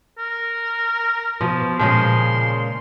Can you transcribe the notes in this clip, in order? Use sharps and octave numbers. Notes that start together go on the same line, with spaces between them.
A#4
B2 F3
A#2 C#3 F3 G#3 C6